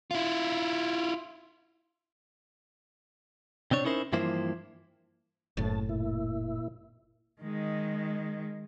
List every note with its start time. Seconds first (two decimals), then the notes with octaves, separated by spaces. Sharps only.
0.11 E4 F4
3.71 C3 C4 D4 C#5
3.85 C#4 D#4 E4 A#4 C5
4.13 G2 E3 F3 A#3 E4 C5
5.57 F#1 A2 A5
5.89 A#2 E4
7.42 D#3 G#3